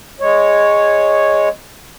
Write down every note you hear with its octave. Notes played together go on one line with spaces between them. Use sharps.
G#3 C#5